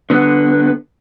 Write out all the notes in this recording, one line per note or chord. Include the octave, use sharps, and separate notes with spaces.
D3 B3